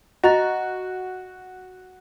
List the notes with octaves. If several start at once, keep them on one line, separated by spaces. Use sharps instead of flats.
F#4 D#5 A#5 A6